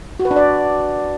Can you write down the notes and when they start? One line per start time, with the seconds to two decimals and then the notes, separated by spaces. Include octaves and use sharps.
0.20 F#4
0.25 B4
0.31 D4
0.36 D5